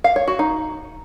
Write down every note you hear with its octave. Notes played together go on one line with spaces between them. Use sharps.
F5
C#5
F#4
D#4